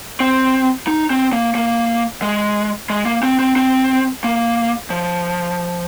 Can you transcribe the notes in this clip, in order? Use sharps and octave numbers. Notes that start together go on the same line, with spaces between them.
C4
D#4
C4
A#3
A#3
G#3
G#3
A#3
C4
C4
C4
A#3
F3